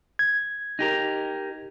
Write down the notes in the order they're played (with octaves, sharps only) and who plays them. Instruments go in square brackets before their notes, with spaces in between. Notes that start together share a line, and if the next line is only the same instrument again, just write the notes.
[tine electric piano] G#6
[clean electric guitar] D#4 G4 A#4